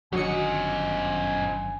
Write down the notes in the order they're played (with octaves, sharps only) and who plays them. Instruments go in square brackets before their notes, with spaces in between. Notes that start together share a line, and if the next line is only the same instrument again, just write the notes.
[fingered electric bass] G1 D3 D#3 [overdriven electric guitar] F#2 D#5 [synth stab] F#3 C#7 [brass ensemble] G#5